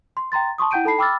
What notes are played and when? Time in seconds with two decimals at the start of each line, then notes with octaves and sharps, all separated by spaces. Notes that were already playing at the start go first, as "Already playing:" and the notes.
0.17 C6
0.32 G5 A#5 C6 A6
0.58 A5 C6 C#6 D#6
0.71 E4 F#5 G5 G6 D7 D#7
0.84 D#4 A4 A5 B5 C7
0.98 G5 B5 D6 E6 F6 A6